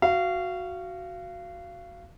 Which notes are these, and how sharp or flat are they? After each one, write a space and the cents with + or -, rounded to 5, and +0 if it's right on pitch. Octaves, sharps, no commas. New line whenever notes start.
F#4 +0 F5 -25